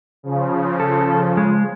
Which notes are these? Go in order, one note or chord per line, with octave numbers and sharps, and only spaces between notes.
C#3 F3
A4
G#3